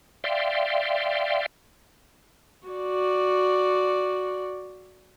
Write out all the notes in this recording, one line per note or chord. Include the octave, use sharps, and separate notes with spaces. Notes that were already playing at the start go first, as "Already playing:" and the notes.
D5 E5 F5 G5 C6
F#4 D5